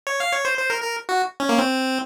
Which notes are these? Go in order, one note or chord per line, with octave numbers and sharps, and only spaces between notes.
C#5
F5
C#5
C5
C5
A#4
A#4
F#4
C#4
A#3
C4